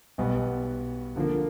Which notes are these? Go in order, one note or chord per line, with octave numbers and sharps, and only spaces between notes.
B1 B2 G3 B3
D3 F3 A#3